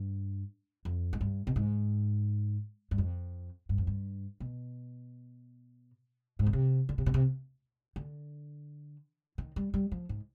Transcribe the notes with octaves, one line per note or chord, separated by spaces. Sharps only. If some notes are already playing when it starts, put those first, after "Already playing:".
Already playing: G2
F2
G#2
G2
B2
G#2
G2
F2
G2
F2
G2
B2
G#2
B2
C3
D3
C3
B2
C3
D3
D#3
G3
G3
F3
G#2